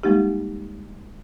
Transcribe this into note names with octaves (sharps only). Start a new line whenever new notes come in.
G3 G#3 A#3 D#4 G4